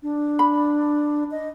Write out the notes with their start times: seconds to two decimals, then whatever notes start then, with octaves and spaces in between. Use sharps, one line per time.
0.03 D4
0.39 B5
1.31 D#5